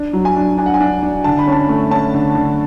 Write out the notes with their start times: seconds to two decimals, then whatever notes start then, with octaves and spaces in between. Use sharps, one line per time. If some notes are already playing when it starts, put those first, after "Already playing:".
Already playing: D4
0.13 F#3
0.25 G#5
0.36 D4
0.57 D4 G#5
0.66 F#5
0.74 G#5
0.80 D4
1.02 D4
1.24 D3 A5
1.39 B5
1.47 C#4 A5
1.69 A3
1.91 C#4 A5
2.14 D3
2.35 D3